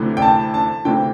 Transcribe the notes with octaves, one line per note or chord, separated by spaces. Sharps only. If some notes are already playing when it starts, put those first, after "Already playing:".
Already playing: D2 C3 E3
G5
A5
A5
D2 C3 E3 G5